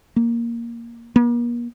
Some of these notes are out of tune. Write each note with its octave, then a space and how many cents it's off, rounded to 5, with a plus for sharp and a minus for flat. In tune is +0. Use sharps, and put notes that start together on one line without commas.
A#3 +5
A#3 +40